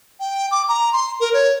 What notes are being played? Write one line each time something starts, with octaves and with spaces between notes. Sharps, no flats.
G5
D6
A#5
C6
A#4
C#5